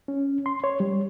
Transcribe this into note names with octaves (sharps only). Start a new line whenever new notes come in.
C#4
C6
C#5
G3